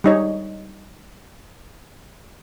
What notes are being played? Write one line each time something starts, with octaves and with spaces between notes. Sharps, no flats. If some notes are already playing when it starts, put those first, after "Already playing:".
G3 D#4 C#5